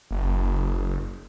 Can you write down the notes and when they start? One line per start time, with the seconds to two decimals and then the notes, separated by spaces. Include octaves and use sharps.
0.11 F#1